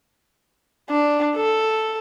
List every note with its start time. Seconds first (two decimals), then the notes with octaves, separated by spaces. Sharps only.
0.90 D4
1.36 A4